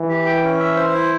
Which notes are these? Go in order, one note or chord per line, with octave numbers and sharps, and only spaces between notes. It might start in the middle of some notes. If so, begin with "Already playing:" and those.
Already playing: E3
G4
G5
C#4
E5
C5
E4